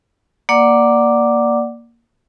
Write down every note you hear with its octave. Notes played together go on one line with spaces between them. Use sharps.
A#3 D5 F#5 D6